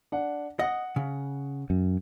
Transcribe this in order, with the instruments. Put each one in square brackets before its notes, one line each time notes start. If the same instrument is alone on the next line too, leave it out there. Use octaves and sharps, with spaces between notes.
[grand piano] D4 F#5
[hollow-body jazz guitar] D#5 [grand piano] F#5
[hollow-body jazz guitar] C#3
[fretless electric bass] F#2